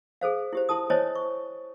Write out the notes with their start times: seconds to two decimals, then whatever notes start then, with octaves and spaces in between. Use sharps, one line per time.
0.21 G#4 A4 C5 F5
0.53 E4 G4 C5
0.69 E4 A4 A5 D#6
0.90 E4 C5 C#5 D#5 G#5 A5
1.15 C#6